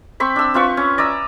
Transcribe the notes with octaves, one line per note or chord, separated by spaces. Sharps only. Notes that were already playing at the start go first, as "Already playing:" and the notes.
C4 B5 C#6
D4 E6
C4 F4 B4 C#6
C#4
D5 A#5 D#6 E6